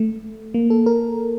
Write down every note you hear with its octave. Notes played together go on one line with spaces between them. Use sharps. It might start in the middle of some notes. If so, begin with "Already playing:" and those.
Already playing: A3
A#3
A4
A#4